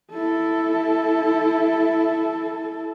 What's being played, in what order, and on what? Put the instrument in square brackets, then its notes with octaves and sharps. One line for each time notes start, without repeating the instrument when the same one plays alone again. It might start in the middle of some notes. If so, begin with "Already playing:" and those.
[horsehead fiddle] E4 A4